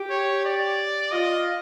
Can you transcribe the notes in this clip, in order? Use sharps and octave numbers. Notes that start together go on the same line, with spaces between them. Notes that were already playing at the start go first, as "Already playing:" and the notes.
Already playing: G4
C#5
D5
F4 D#5